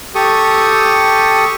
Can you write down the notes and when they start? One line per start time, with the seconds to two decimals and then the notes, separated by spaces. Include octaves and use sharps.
0.15 G4 A4 C#6 D#6